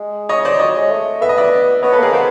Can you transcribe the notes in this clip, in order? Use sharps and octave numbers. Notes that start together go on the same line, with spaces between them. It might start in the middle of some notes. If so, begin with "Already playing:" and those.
Already playing: G#3
C#5 D#5
C5 D5
F#3 C#5 D#5
G#3
A3
B3 E5
D#5
D5 E5
B3 C#5 D#5
A4 B4
A#3 G#4 A#4
B3 A#4 C5